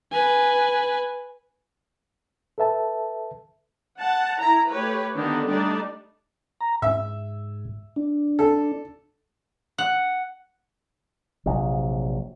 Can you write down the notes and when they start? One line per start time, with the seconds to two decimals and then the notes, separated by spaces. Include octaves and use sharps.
0.12 B4 G#5
2.58 A4 B4 E5 A5
3.98 F#5 A5
4.38 E4 A#5
4.69 A3 G4 B4 C#5
5.16 D3 D#3 A#3 B3 D4 G4
5.47 G3 A3 D4 D#4 D5
6.61 A#5
6.82 G#2 E5
7.96 D4
8.39 A4
9.78 F#5
11.46 A#1 C3 F#3